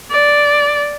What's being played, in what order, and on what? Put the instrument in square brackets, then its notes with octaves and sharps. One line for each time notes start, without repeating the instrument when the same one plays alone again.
[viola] D5